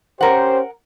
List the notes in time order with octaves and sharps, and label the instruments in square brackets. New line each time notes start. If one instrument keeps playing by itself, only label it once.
[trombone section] C#4 G4 C5 [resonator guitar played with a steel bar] A#4 F#5